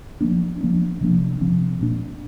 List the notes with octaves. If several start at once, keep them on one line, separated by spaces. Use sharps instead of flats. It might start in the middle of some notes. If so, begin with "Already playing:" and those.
F3 A#3 D4
F3 A#3 D4
C3 F3 A#3 D4
C3 F3 C4
A#2 A#3 D4